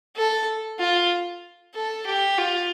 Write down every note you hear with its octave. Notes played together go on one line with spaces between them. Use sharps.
A4
F4
A4
G4
F4